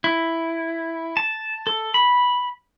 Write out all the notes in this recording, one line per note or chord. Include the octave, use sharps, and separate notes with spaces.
E4
A5
A4
B5